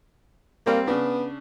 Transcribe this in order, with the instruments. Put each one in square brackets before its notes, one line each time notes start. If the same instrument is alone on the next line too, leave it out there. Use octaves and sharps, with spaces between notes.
[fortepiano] G3 C4 F5 [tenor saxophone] A#3
[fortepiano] C#3 D4 [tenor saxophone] B3